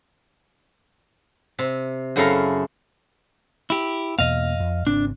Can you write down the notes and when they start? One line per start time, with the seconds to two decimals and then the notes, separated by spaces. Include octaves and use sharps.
1.59 C3
2.16 F#2 C#3 E4 A4 F5 A#5
3.70 E4 G4
4.19 E2 B2 A#3 D#5 F5
4.60 F2
4.87 G#1 C#3 C4 D4